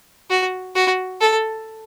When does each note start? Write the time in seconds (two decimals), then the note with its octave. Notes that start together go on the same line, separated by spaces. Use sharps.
0.30 F#4
0.75 F#4
1.21 A4